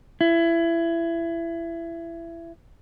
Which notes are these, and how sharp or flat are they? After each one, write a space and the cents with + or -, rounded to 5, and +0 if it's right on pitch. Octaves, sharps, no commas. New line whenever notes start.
E4 +25